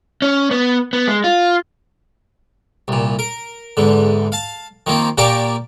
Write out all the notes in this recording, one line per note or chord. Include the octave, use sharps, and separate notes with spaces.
C#4
B3
B3
G#3
F4
C2 A#2
A#4
E2 G#2 D3
F5 A5
D#3 F3 A#3 C4
A#2 A#3 G4 A#4 D5 C#6